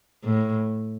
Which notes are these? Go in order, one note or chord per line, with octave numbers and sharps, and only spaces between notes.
A2